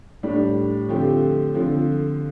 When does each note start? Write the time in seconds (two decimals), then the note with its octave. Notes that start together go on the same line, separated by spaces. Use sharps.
0.23 A2 G3 D4
0.88 D3 F3 A3 C4 G4
1.54 D3 F3 C4